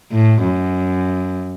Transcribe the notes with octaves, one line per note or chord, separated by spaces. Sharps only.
A2
F#2